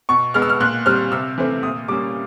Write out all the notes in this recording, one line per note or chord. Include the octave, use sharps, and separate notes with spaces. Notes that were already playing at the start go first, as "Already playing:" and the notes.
B2 C#6
G#3 B3 F6
E6
F6
A#2 F#6
G3 C4 F6
C3 E6
E3 A3 C4
A#2 D#6
G3 A#3 C#4 D6